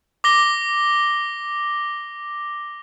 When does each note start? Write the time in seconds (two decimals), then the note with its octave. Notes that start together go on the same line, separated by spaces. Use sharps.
0.24 D6 A#6 G7